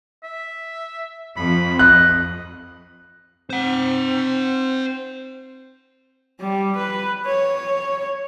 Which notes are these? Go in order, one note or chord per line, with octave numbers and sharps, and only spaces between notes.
E5
F2 B5
D#5 F#6
C4 C5 F#5
G3
B4
C#5